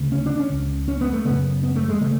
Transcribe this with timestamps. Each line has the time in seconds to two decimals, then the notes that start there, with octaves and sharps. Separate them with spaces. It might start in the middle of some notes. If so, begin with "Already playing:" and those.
Already playing: D2 C#3
0.12 C#4
0.26 D4
0.40 C#4
0.50 C#2 C#3
0.88 C#4
1.01 B3
1.13 A3
1.25 F#2 C#3 B3
1.63 B3
1.76 A3
1.89 G#3
2.01 C#3 A3